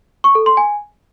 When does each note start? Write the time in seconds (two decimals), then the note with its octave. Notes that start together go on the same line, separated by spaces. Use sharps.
0.24 C#6
0.35 A4
0.46 C6
0.57 G#5